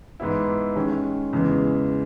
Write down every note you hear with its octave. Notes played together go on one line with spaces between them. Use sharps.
G#2 E3 B3 E4
D#3 G#3 C#4
E2 C#3 E3 G#3